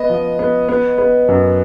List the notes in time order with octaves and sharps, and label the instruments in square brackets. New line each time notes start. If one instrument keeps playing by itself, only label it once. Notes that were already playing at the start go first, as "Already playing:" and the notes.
Already playing: [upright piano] B3 D#5
F3
B3
B3
B3
F#2